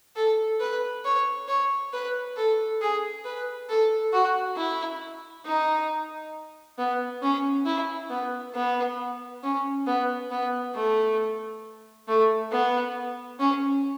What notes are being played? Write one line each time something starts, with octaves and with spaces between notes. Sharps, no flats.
A4
B4
C#5
C#5
B4
A4
G#4
B4
A4
F#4
E4
D#4
B3
C#4
E4
B3
B3
C#4
B3
B3
A3
A3
B3
C#4